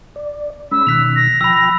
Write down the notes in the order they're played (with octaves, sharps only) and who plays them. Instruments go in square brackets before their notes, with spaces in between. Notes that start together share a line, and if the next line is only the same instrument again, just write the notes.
[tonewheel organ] D5
[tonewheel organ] G#3 C#4 B5 [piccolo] E6
[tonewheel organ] B2 D#3 [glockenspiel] F#6 B6 F7
[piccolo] A#6
[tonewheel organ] F3 G5 [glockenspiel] B5 E6